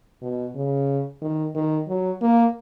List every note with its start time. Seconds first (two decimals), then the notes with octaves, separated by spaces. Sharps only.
0.22 B2
0.55 C#3
1.22 D#3
1.55 D#3
1.88 F#3
2.21 A#3